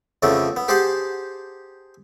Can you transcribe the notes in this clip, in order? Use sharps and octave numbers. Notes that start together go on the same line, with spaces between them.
F2 C#3 E3 A3 B3
B3
G4 G#4 C5 F#5 A5